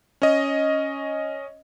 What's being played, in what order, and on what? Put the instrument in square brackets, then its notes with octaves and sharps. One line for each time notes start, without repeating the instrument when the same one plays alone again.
[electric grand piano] C#4 D#5